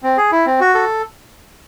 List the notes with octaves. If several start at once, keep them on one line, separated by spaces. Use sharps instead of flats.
C4
G#4
E4
C4
F#4
A4